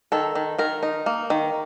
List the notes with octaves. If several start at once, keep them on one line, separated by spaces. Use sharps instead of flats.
D#3 A4
D#3
D#3 A#4
D#4
A#3
D#3